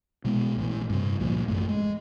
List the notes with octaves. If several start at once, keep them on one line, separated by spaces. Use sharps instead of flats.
B2 G#3 B3
A#1 A2 E3
G2 C3
C#2 A#2 F3
A1 F#2 A3
G#3